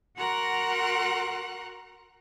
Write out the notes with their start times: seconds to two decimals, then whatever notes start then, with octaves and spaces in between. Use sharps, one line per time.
0.16 F#4 A#4 F#5 A#5 C6 F#6